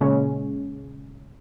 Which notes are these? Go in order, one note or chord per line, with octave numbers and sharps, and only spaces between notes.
A#2 C#3 G#3 C#4